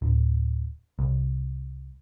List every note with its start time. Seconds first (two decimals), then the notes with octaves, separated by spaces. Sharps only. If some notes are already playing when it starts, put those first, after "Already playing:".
0.02 D1
0.99 C2